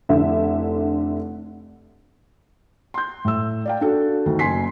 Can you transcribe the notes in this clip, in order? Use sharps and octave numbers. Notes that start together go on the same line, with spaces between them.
F1 D3 E4 E5
C6 G6
A2 E6
D5 F5 G5
D4 F#4 A4
D2 D#3
F#1 G#5 C6 B6 C7